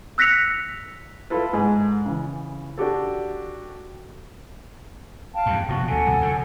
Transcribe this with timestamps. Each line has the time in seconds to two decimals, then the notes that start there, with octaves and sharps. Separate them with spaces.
0.18 E6 F#6 A#6 B6 C#7 F7
1.30 E4 F4 A4 B4
1.53 G#2 G#4
2.06 C#3 E3
2.78 D4 F#4 G4 A4
5.34 F5 G5 A5
5.46 E2 G2
5.68 F1 B2 F3 F#4
5.88 D2 B2 A4 F#5 G#5
6.07 D#1 C2
6.21 F2 C#3